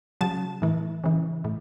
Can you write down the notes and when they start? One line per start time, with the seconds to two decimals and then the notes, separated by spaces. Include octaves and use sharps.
0.21 C#3 F#3 A5
0.62 A2 E3
1.04 C#3 E3
1.44 A2